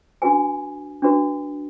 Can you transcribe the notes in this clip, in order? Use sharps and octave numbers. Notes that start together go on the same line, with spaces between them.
D4 F#4 B4 G#5
D4 F#4 B4